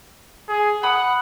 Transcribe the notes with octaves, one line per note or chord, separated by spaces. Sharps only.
G#4
F#5 B5 D#6